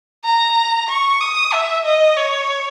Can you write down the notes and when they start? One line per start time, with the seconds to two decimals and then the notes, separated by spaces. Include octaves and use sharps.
0.25 A#5
0.89 C#6
1.21 D#6
1.53 E5
1.85 D#5
2.17 C#5